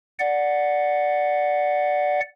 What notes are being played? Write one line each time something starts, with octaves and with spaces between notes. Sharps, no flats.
D5 F#5